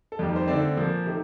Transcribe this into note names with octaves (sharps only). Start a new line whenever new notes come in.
A4
F2 D#3 G3 A#3 A#4
C5
D3 A3 C4 D5
A#2 F3 A#3
C3 D#3 A3